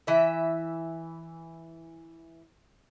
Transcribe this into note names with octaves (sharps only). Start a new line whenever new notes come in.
E3 E5